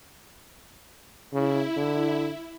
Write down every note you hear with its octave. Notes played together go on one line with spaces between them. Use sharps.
C#3 E4
D3